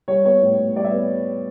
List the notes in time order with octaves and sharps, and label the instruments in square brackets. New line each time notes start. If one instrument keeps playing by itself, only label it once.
[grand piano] G3 C#5
B3 C#5
A2
A2
G3 D5
E5
B3